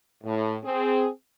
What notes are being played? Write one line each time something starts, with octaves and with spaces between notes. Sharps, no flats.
A2
C4 G#4